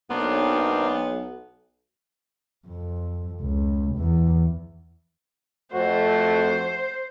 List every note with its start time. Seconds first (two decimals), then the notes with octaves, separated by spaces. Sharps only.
0.11 B1 A#3 B3 D4 C5
2.67 F2
3.41 C#2
3.95 E2
5.74 F2 A3 F#4 C5